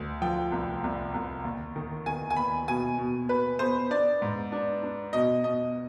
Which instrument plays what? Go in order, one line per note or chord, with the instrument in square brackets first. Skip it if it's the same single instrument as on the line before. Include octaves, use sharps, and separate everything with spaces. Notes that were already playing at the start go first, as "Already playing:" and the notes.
Already playing: [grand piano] D2
F3 G5
C2
C2
C2
D#2
D#3
D#3 G#5
G#5
D#2 B5
B2 G#5
B2
B2 B4
B3 C5
D4 D5
G#2
D4
D4
B2 D#5
B2 D#5